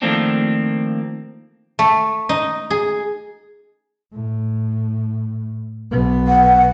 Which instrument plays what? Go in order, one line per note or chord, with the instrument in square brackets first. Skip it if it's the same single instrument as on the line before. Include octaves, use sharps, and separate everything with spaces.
[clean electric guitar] D#3 F3 A3 A#3 C4 D4
[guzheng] A3
D#4
G#4
[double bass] A2
B1 B3
[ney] F#5